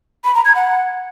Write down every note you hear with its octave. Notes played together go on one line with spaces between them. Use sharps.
B5
A#5
G#6
F#5